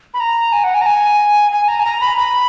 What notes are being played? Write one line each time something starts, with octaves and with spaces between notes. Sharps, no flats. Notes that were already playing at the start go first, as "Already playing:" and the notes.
B5
A#5
G#5
F#5
G#5
A#5
G#5
G#5
A#5
G#5
A#5
B5
B5